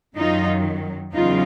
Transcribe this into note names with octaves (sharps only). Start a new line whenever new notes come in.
F#2 D#3 F#3 D#4 F4
E2 C#3 F#3 D#4 F4